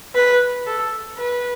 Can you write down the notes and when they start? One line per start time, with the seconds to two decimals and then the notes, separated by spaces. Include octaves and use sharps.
0.15 B4
0.67 A4
1.17 B4